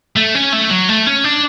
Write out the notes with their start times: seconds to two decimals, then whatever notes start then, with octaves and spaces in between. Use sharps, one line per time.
0.16 A3
0.35 C#4
0.53 A3
0.70 F#3
0.89 A3
1.06 C#4
1.24 D4